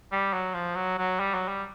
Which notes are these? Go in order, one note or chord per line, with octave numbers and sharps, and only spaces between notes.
G3
F#3
F3
F#3
F#3
G3
F#3
G3